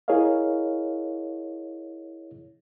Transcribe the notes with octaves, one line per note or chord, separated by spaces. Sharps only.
E4 G#4 A#4 C#5 D#5 F5